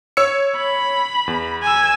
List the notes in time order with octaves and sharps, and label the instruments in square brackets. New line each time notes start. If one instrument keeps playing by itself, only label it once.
[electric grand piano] C#5 E6 C#7
[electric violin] B5
[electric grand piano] E2
[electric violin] G#5 E6